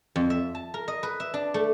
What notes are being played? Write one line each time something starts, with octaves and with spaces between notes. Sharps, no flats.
F2
E5
A5
A#4
D#5
B4
E5
D4
A3